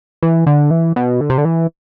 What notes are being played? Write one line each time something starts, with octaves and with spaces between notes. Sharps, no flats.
E3
D3
E3
B2
D3
C3
D3
E3